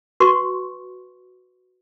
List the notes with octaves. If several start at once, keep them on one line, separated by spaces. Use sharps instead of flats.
F#4 B4 C6 C#6